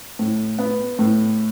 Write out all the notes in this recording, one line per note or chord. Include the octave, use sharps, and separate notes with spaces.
A2
B3
A2